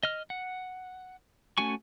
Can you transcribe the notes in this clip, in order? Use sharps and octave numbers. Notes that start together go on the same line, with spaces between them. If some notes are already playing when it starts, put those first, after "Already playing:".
D#5 F6
F#5
A3 C#4 F#4 G#5 C#6